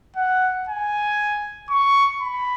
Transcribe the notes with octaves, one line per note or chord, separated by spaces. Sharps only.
F#5
G#5
C#6
B5